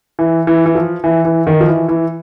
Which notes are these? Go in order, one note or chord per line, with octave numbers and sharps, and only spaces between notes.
E3
E3
E3
F3
E3
E3
D#3
F3
E3
E3